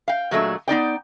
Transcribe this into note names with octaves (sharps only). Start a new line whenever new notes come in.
F5 G5
A#2 F#3 G#3 A3 D4
B3 D#4 D5 G5